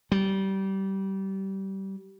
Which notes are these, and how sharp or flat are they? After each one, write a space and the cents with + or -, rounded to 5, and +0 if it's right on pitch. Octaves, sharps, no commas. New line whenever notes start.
G3 -25